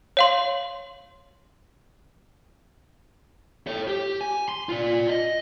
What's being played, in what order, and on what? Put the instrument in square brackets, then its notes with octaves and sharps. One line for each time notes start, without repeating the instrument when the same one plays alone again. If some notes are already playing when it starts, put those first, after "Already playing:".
[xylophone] C#5 F5 C6
[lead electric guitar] A4 C#5
G4
G#5
C6
F4 D5
D#5